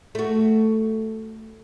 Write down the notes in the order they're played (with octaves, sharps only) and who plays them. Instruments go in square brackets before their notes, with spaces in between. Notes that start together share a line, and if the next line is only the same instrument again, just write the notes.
[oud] A3 F#4